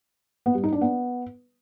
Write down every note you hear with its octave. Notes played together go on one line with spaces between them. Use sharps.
B3
G3
D#4
D4
B3